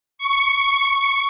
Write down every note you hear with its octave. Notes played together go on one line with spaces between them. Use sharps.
C#6